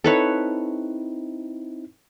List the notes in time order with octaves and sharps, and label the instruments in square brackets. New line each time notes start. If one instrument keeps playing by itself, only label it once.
[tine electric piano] C4 D#4 E4 [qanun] A4 B4 C#5